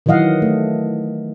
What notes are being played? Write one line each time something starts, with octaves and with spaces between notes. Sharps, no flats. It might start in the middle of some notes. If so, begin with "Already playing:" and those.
D#3 E3 F#3 D#5 F5 F#5
A3